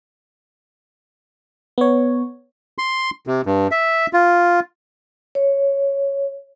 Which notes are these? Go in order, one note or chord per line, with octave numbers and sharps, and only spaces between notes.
B3 C#5
C6
C3
G2
E5
F4
C#5